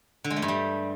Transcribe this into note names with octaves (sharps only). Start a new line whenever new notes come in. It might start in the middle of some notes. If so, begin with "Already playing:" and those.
D3
G#3
A3
G2
G3